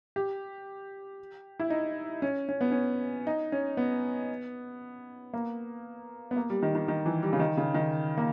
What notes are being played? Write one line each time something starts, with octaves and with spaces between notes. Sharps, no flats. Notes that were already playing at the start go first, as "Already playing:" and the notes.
G4
E4
D#4
C#4
C#4
B3
C#4
D#4
C#4
B3
A#3
B3
A#3
G3
D#3
D#3
D#3
E3
G3
C#3
D#3
C#3
D#3
A#3